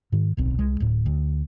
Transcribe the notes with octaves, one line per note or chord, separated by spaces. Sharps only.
G#2 D#3
D1 B1 C4
C2 G#3
D1 A2
D2